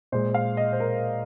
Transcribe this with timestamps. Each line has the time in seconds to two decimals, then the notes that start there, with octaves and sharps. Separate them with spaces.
0.12 A#2 G#3 C5
0.34 F5
0.57 D#5
0.73 C5
0.80 A#4